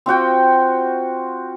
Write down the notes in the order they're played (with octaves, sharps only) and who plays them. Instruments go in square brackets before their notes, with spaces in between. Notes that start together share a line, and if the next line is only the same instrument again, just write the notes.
[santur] C4 F4 F#4 G5